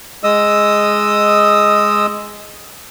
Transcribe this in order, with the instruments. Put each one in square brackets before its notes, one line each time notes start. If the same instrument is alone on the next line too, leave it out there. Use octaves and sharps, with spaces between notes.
[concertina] G#3 D#5 D#6 E6